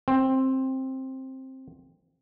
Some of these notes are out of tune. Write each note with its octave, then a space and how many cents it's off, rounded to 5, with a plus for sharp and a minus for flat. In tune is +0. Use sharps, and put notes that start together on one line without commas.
C4 +10